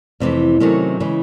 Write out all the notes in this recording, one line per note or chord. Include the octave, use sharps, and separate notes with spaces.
F2 C3 E3 A3
C3 D#3 F#3 A3 C#4
C#3 E3 G#3